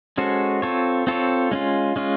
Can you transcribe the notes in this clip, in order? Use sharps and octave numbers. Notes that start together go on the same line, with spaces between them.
G#3 C#4 F#4 A4 C5
C4 F4 A4 C#5
C4 F4 A4 C#5
G#3 C#4 F4
G#3 C#4 F4